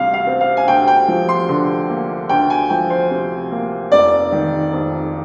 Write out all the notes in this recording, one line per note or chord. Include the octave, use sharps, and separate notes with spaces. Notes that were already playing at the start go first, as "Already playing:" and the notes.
Already playing: D2 C3 G3 F5
F5
C4
F5
G#5
D2 G5
G5
F3
C6
D3
A#3
D2 G5
G#5
F3 G5
C5
C3
A#3
F1 D5
D#3
F2